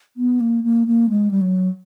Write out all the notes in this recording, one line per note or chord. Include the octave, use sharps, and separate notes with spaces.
B3
A#3
A#3
A#3
G#3
G3
F#3